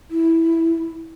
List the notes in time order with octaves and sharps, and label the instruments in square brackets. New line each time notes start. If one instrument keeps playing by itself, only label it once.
[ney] E4